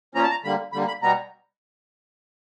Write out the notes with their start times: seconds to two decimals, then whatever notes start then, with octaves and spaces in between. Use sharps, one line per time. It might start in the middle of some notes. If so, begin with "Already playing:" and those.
0.15 A#2 F3 A#3 C#4 A#5
0.23 A5
0.31 A#5
0.44 D3 G3 A#3 B5
0.73 D3 G3 A#3 B5
0.88 B5
1.02 B2 G3 B3 A#5